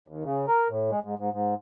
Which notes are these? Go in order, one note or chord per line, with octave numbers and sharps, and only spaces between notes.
D#2
C#3
A#4
A2
G#3
G#2
G#2
G#2